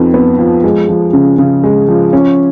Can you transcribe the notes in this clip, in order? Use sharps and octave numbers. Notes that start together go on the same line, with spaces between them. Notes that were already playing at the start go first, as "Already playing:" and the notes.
Already playing: F2 F3 B3 D#4
B3
F3
G#3
F3
C#3
C#3
G#3
F3
C#4